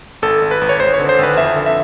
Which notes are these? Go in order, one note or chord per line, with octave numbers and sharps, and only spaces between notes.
G#1 A4
G#1
B4
G#1
C#5
G#1 C5
C#5
D3
C5
G#1 B4
F2 E5
D3
E5